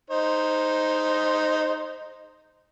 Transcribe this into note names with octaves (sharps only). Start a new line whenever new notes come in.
D#4 C5